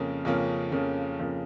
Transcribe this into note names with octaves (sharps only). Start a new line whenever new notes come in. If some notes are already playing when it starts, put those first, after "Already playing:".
Already playing: F2 C#3 F3 A#3 C#4
F2 C#3 F3 A#3 C#4
F2 C#3 F3 A#3 C#4
F2 C#3 F3 A#3 C#4